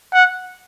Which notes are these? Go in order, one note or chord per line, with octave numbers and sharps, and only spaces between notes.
F#5